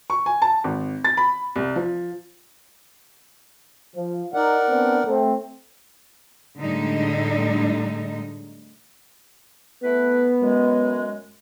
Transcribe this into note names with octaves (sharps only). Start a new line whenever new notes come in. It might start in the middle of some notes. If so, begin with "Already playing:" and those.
C#6
G#5
A5
G#1
A6
B5
C2
F3
F3
D#4 A#4 D5 F#5
B3 C4 D4
A3 C4
A2 D3 G3 G#3 D#4
A3 B3 E4 B4
F#2 G#3